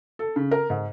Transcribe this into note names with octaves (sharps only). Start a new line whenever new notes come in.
A4
C#3
A#4
G#2